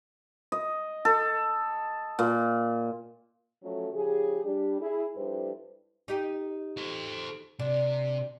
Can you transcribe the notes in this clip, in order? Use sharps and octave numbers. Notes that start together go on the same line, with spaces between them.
D#5
A4
A#2
F3 F#3 A3 C#4
C#3 F3 G4 G#4
G3 D4 G4
E4 G#4
F2 G3 D4 E4 B4 C5
D#4 G4 D#5
A4 C5
C3 D4